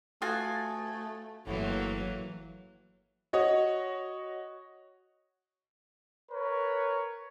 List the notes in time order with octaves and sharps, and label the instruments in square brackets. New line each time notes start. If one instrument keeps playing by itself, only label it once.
[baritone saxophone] A3 [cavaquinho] F4 F#4 G#5 [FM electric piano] D#6 G#6 A6
[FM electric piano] G1 [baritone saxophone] A2 [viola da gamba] E3 F#3 A#3
[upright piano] F#4 C#5 D#5
[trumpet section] A#4 B4 C#5